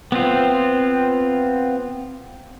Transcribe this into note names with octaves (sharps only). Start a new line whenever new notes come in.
B3 C4 F4